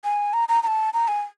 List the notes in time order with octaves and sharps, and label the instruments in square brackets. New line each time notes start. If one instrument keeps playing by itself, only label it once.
[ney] G#5
A#5
A#5
A#5
A5
A#5
G#5